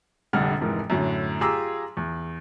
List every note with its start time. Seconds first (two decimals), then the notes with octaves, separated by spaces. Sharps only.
0.33 F1 A#1 D3 G3 F#5 F6
0.61 F1 G#2 E3 A#4
0.90 F#2 A2 D3 F#3
1.41 F4 G4 G#4 A#5 D6 E6
1.97 E2